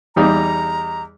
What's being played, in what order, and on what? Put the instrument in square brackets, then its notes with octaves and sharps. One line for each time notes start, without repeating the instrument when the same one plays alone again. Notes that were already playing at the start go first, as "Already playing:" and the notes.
[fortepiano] E2 G3 D#4 [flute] A#5